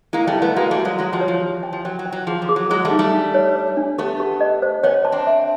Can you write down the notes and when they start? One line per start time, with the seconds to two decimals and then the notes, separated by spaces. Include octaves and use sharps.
0.13 G#3 A#3 E4
0.27 G3 A3
0.35 E4
0.42 A3 B3
0.56 G#3 A#3 F#4
0.71 G3 A3
0.78 F#4
0.85 F#3 G#3
0.98 F#3 G#3 F#4
1.13 F3 G3
1.21 C#5
1.28 F3
1.41 G4
1.63 G5
1.73 F3
1.85 F#3 G5
1.99 F#3
2.06 G5
2.12 F#3
2.27 F3 G#4
2.42 F3
2.49 G#4
2.56 F#3
2.70 F#3 G#3 G#4
2.85 G3 A3
2.91 D#4
2.99 G3 A3
3.12 D4
3.34 C#5
3.56 C#5
3.77 D4
3.98 A3 B3 G4
4.20 G4
4.41 D#5
4.62 C5
4.83 B3 C#4 C#5
5.05 A5
5.12 C4 D4
5.27 E5